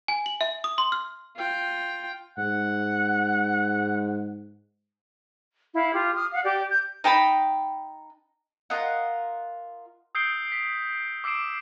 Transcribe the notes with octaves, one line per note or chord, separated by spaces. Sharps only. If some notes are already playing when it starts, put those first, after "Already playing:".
G#5
F#7
E5
D#6
C6
F6
F4 G5
G#2 F#5
E4 F5
F4 G4
D#6 F6
F5 F#5
G4 D5
G6
D#4 G5 A5 B5
F4 A#4 D#5 F#5
D#6 E6 G6 C7 D7 G7
B6
D6 E6 C7 D7 E7